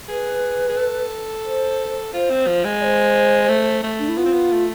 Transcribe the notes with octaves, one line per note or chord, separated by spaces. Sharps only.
G#4 B4
G#4
A4
C5
F4 C5
C4
F3
G#3
D5
C5
A3
A3
D4
E4
B3 F4
C4
B3
A3